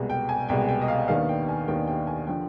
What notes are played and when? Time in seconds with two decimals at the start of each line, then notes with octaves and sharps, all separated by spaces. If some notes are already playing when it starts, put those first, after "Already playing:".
Already playing: C2 B2 G#3
0.10 G5
0.29 G#5
0.49 C2 B2 G#3 G5
0.68 G5
0.82 D#5
0.88 F5
1.08 D#2 D#3 B3 D4 F5
1.29 G5
1.49 G#5
1.68 D#2 D#3 B3 D4 G5
1.87 G5
2.07 G#5
2.27 D3 F3 G5